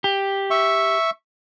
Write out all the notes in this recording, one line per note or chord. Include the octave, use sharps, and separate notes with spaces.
G4
E5 C#6